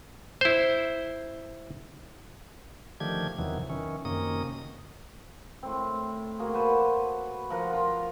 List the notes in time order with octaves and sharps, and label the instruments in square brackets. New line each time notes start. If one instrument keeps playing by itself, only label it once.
[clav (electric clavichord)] E4 C5
[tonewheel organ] D3 D#3 F3 A3 G4 G#6
E2 C3 D#3 E3 F#3
D#3 E3 C#4
F#2 C3 D#3 A#3 C#4 D#6
[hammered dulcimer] A2 C4
A#3 F#4 G#4
F#4 B4 C5 A5
F3 A#4 F#5
F4 A#4